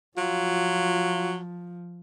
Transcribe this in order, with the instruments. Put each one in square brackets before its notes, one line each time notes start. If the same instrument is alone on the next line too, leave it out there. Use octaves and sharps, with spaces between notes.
[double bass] F3 [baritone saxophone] F#3 [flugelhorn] F4